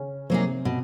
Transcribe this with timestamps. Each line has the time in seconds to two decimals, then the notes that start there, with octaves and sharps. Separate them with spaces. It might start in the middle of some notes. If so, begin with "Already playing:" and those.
Already playing: C#3 C#4
0.30 C3 F#3 A#3 C4 D#4 G#4
0.65 B2